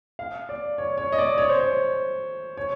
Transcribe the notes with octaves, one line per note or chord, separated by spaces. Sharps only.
F5
D5
C#5
C#5
D#5
D5
C#5
C5
C#5
C#5